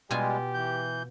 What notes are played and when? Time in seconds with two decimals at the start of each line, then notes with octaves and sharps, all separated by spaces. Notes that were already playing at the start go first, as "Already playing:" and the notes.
0.11 B2 G3 G#3 F4 G4 G#5
0.54 E3 G6